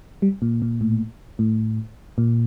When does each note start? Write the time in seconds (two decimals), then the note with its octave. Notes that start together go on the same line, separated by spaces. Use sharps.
0.22 G3
0.42 A#2
0.62 A#2
0.81 A2
1.39 A2
2.18 A#2